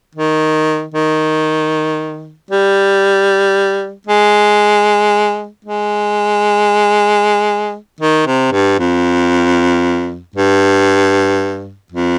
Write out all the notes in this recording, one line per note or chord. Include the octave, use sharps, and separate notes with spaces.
D#3
D#3
G3
G#3
G#3
D#3
C3
G2
F2
G2
F2